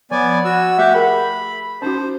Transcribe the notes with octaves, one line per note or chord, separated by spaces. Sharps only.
F3 B3 D5 G#5
F#4 E6
A3 G4 E5 F#5
G#4 A#4 F#5 B5
C#4 D#4 F#4 C5